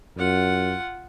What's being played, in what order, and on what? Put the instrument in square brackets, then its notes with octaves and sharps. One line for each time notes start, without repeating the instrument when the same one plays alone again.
[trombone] F#2 [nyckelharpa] F4 F#5